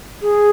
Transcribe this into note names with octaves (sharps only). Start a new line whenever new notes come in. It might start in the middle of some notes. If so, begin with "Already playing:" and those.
G#4